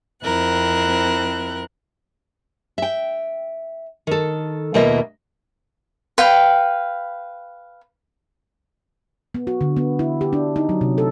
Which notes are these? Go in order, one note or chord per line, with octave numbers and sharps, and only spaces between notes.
F2 C4 E4 A#4 F#6
E5 G5
D#3 A4
D#2 B2 A#3 F4 D#5 E5
B4 F5 G5
B3
F#4
D3
B3
E4
G4
D4
D#4
F#3
C3
A4